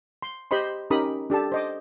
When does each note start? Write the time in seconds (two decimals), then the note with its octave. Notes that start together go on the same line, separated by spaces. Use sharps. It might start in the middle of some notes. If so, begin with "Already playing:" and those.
0.22 C6
0.51 G4 C5 D#5 B5 C6
0.90 C#4 D#4 G4 A#4 B5 D#6
1.30 D4 G4 A4 A5
1.52 C5 D#5 D6